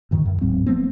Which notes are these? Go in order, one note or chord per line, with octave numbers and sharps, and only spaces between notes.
D2 G2 D#3
F#2
D1 G#2 F#3 C4
F3 A3 B3 C4